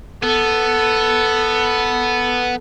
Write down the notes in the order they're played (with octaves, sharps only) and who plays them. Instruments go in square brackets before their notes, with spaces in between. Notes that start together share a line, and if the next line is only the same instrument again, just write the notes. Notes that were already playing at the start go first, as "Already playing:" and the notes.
[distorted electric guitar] B3 [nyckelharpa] A4